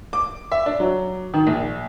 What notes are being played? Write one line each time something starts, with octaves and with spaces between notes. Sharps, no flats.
D6
E5
D4
F#3
D#3
A#1